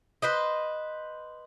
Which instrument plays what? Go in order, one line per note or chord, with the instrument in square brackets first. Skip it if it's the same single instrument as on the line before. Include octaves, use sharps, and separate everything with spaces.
[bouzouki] B4 C5 D#5